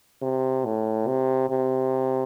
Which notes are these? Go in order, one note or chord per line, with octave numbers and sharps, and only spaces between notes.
C3
A2
C3
C3